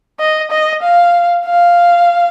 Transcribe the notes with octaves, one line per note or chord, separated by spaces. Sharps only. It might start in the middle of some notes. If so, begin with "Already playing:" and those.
D#5
D#5
F5
F5